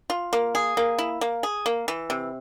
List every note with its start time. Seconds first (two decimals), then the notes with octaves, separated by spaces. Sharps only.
0.10 F4
0.33 A#3
0.55 G#4
0.77 A#3
0.98 E4
1.21 A#3
1.43 G#4
1.66 A#3
1.88 E3
2.10 C3